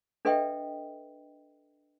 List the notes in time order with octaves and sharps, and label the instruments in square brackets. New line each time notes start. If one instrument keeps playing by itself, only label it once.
[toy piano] D4 A4 B4 D#5 E5 G5